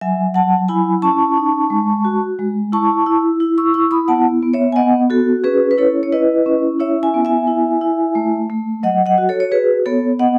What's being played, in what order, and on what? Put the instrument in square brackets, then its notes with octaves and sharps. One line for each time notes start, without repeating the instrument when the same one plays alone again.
[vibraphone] F#3 E5 G#5
F#3 F#5 A5
E4 G#5 B5
C#4 A5 C#6
D#4
G#3
F#4
G#3
E4 A5 C#6
E4
E4
C#6 E6
E4 C#6 E6
B5 D#6
B3 F#5 A5
B3
C#5 E5
G#5
B3 D#5 F#5
F#4 A4
C#4 G#4 B4
B4
E4 A4 C#5
C#5
E4 B4 D#5
C#4
E4 C#5 E5
E5 G#5
B3
E5 G#5
E4
E4
A3
A3
F#3 D#5 F#5
D#5 F#5
F#4
A4 C#5
C#5
F#4 G#4 B4
B3 A4 C#5
B3 D#5 F#5